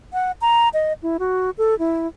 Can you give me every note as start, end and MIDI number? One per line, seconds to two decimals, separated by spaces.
0.13 0.32 78
0.41 0.69 82
0.74 0.93 75
1.03 1.17 64
1.19 1.50 66
1.58 1.78 69
1.79 2.07 64